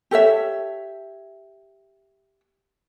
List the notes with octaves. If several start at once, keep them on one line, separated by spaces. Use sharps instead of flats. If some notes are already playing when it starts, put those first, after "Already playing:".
G4 A4 C#5 E5